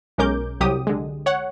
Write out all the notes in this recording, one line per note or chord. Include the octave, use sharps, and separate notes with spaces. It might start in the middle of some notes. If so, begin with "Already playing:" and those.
B1 G#3 C#4 A#4 D6 G6
C2 F#3 G4 D#6
D3 G#3
C#5 F#5